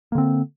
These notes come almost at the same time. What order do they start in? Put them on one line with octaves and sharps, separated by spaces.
A#3 D3 C4